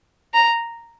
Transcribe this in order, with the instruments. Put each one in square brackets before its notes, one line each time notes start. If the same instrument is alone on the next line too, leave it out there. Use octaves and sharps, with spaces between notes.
[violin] A#5